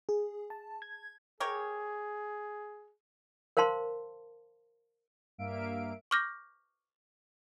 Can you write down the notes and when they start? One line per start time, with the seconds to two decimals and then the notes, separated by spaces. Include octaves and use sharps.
0.09 G#4
0.50 A5
0.82 G#6
1.40 G4 G#4 A#4 C#5
3.57 A#4 C5 F5 A5 C6
5.38 G2 G3 A#3 E5 F5 D7
6.11 C#6 D6 F6 G6 A#6